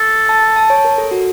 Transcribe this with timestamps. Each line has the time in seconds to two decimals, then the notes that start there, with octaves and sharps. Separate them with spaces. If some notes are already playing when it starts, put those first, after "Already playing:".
Already playing: A4
0.29 A5
0.56 A5
0.70 C#5
0.85 A#4
0.98 A4
1.11 F#4